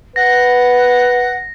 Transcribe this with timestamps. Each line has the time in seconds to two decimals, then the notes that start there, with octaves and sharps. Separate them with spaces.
0.16 B4 F#5 A#6